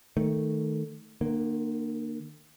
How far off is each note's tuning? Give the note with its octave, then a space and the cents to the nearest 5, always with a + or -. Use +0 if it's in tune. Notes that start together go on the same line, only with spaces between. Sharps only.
D#3 +0 A3 +0
D3 +45 A#3 +0